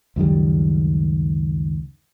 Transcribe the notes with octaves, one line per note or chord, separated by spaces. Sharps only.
C#2 F#2 D#3 G3